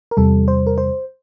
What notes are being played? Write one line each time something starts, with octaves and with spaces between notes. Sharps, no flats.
A#4
E2 C3 G3 A4
C5
A#4
C5